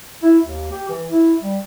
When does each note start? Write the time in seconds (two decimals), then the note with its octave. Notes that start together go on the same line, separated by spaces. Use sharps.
0.22 E4
0.43 D#2
0.72 G4
0.89 E3
1.10 E4
1.41 G3